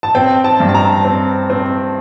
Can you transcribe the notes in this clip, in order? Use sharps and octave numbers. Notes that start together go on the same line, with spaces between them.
A5
C4 G5
A5
G2
A5
A#5
C4
C4